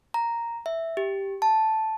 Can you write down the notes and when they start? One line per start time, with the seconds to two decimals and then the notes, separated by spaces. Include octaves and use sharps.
0.14 A#5
0.66 E5
0.97 G4
1.42 A5